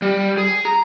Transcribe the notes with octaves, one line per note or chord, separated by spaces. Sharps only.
G3
G#4
A#5